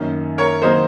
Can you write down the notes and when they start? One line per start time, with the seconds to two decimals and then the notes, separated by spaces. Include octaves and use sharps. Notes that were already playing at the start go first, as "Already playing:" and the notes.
Already playing: F#2 D#3 A#3 C#4
0.38 A#4 C#5
0.62 C3 D#3 F#3 A#3 C5 D#5